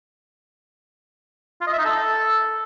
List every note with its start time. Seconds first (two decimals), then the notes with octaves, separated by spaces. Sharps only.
1.61 F4
1.67 D#5
1.73 E5
1.79 D#4
1.85 A4